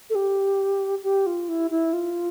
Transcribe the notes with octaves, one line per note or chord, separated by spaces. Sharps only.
A4
G4
G4
F4
E4
E4
F4